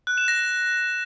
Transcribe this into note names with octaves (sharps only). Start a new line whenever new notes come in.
F#6
E7
A#6